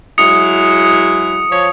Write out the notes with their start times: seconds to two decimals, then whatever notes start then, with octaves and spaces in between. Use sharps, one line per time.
0.18 F#3 G#3 E4 D#6 C#7
1.50 F3 C#5